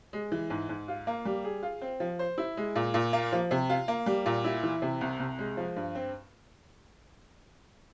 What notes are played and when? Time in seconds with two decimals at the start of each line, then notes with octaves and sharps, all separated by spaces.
0.13 G#3
0.32 E3
0.50 G#2
0.69 G#2
0.88 F4
1.07 A#3
1.25 G3
1.44 G#4
1.63 F4
1.82 C4
2.00 F3
2.19 C5
2.38 E4
2.57 G#3
2.76 A#2
2.94 A#2
3.13 A#3
3.32 F3
3.51 C3
3.69 F4
3.88 A#3
4.06 G3
4.26 A#2
4.44 E4
4.63 E3
4.82 C3
5.01 C2
5.19 C2
5.39 G#3
5.57 F3
5.76 G2
5.95 C4